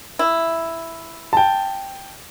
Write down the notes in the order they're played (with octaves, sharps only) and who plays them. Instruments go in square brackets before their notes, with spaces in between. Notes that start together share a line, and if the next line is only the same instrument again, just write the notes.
[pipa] E4
[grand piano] G5 A5